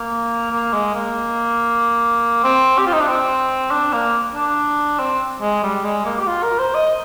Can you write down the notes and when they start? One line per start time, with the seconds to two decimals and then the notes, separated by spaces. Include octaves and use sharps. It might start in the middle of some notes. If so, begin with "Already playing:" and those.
Already playing: A#3
0.52 A#3
0.73 G#3
0.95 A#3
2.44 C4
2.78 G4
2.86 F4
2.93 D#4
3.00 D4
3.08 C4
3.71 D4
3.93 A#3
4.35 D4
4.99 C4
5.41 G#3
5.63 G3
5.84 G#3
6.05 A#3
6.20 G4
6.27 F4
6.43 A#4
6.59 C5
6.74 D#5